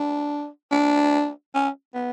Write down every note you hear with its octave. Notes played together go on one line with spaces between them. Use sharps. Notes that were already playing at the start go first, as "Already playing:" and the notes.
Already playing: D4
D4
C#4
B3